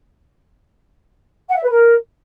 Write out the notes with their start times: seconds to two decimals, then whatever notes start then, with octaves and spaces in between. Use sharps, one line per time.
1.48 F#5
1.55 E5
1.63 B4
1.70 A#4